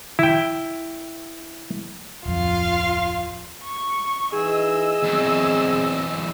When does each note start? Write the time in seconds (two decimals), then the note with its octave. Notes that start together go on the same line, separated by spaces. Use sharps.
0.19 E4 G5
2.25 D1 F2 F4 F5
3.64 C#6
4.33 E3 D#4 G#4 D#5 E6
5.03 E2 F#3 C4